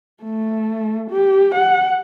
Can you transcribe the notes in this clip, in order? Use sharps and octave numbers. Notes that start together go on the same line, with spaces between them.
A3
G4
F#5